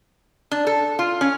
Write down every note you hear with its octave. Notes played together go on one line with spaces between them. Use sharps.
D4
A4
F4
C#4